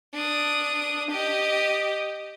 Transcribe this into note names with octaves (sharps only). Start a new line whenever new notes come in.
D4 D#6
G4 D#5